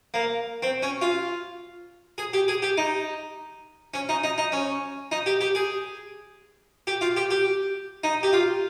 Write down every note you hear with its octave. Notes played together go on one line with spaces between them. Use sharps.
A#3
C4
C#4
F4
G#4
G4
G#4
G4
D#4
C#4
D#4
D#4
D#4
C#4
D#4
G4
G4
G#4
G4
F4
G4
G4
D#4
G4
F4